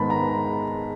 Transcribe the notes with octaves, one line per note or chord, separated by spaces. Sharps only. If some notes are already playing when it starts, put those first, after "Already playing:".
Already playing: G#2 D#3 G#3 B3 A5 B5
A#5